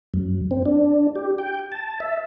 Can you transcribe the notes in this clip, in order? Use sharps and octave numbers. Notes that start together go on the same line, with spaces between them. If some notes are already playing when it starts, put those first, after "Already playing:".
F#2
C4
D4
G4
G5
A5
E5